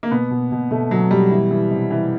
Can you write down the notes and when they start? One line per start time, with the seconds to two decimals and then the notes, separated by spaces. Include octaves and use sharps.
0.03 A#3
0.11 B2 B3
0.31 B2
0.52 B2
0.71 B2 A3
0.90 B2 F#3
1.11 B2 G3
1.31 E3
1.51 E3
1.71 C3
1.90 E3